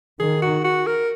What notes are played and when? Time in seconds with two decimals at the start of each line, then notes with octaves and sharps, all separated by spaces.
0.19 D#3 G#4
0.42 F#4
0.64 F#4
0.87 A#4